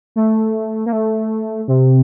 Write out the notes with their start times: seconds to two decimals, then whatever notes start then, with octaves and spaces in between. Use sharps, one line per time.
0.16 A3
0.86 A#3
0.93 A3
1.68 C3